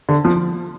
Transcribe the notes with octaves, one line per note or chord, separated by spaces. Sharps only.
D3
F3